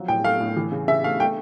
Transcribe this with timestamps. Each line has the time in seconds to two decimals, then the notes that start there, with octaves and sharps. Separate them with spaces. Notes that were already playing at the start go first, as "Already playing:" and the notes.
Already playing: F3 F#3
0.08 A2 G5
0.24 A3 F5
0.40 A2
0.56 E3
0.72 C#3
0.88 C#3 E5
1.04 A3 F5
1.20 A3 G5